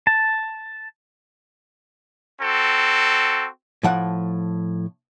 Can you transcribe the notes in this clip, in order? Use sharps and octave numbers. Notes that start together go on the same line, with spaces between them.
A5
C4 F#4 A4
A2 F3 F#5